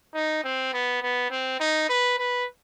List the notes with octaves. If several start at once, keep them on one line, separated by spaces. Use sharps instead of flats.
D#4
C4
B3
B3
C4
D#4
B4
B4